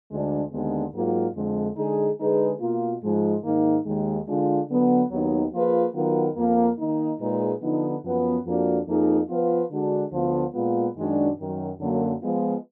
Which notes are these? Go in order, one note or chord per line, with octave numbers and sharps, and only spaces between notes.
D2 D3 G#3 D4
D#2 D3 G#3 B3 D4
G#2 F#3 A#3 F4
F2 D3 G#3
D3 G#3 D#4 G#4
D3 G#3 D#4 G#4 B4
B2 A#3 F4
G#2 F3 G#3
G#2 D#3 A#3 D#4
D#2 D#3 G#3
D3 G#3 D4 F4
D3 F#3 B3
D#2 D#3 F#3 B3 D#4
F3 A#3 F4 G#4 B4
D#3 F#3 B3 F4 A#4
F2 F3 A#3
D#3 A#3 D#4
A#2 G#3 D#4 G#4 B4
D3 F3 B3 D#4
F#2 F3 B3
F2 F3 A#3 D4 F#4
F2 F3 A#3 D#4 G#4
F3 B3 F4 B4
D3 G#3 D4 F#4
D2 D3 F3 B3 F4
A#2 G#3 B3 F4
F#2 D#3 G#3 D4 F#4
F#2 D#3 F#3
F#2 D3 F#3 A#3
F3 G#3 B3 F4